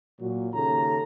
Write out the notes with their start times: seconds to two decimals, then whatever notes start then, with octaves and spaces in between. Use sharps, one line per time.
0.21 A#2 F#3
0.54 D#2 C#3 A4 A#5